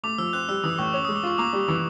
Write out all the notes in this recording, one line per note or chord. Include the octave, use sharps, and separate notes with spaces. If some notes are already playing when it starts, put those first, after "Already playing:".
A3 D6
F3 E6
C4 F#6
G3 E6
E3 D#6
A2 C#6
C#4 D6
G#3 D#6
D6
F4 C#6
A#3 D6
G3
E3